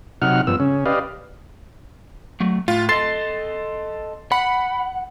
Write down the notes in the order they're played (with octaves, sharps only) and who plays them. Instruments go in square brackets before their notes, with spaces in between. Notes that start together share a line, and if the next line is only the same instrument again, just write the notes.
[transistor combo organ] C3 F#3 D#4 F#5 F6
G2 F3 B3 E6
C#3 C#4
G4 B4 D5 D#5 F5
[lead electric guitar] F#3 A3
[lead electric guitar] A2 [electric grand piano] F4
[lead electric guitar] A4 D#5 [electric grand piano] C6 A6 C7
[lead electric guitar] F#5 [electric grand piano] B5